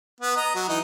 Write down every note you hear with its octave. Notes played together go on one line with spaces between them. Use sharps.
B3
D#5 A#5
F#3
E3 D#4